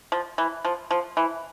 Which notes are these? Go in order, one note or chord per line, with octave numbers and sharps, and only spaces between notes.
F3
E3
F3
F3
E3